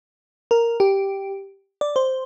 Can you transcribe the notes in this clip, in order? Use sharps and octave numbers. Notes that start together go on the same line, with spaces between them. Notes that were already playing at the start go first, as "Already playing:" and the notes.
A#4
G4
D5
C5